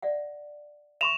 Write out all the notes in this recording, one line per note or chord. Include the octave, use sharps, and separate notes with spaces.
D5 E5 F#5
E5 C6 C#6 E7 F7